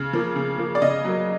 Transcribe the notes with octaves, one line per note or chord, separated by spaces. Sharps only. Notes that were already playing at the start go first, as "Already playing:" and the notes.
Already playing: C#3
F3 A#3
C#3
F3 A#3
D5
C#3 D#5
F#3 A#3